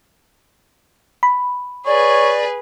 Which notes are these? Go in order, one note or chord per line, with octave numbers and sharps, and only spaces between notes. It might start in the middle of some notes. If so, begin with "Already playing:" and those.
B5
G#4 B4 C#5 D5